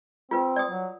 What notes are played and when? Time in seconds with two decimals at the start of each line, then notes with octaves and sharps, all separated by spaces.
0.31 C4 F4 B4
0.56 D5 D#6
0.69 F#3